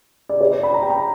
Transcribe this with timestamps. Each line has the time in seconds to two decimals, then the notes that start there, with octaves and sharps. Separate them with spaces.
0.29 D5
0.41 C#5
0.52 D5
0.63 B5
0.74 A#5
0.82 G5
0.90 A#5